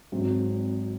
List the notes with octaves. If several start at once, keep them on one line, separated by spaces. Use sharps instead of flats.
G#1 G#2 F#3 C4